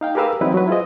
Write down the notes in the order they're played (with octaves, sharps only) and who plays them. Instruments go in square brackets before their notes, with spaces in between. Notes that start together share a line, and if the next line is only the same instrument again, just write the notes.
[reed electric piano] D#4 F5 G5
G4 G#4 A#4 B4 F5 E6
E3 F#3 C4 D#4 E4 B4
F#3 B4
E4 F4 G#4 C5 D#5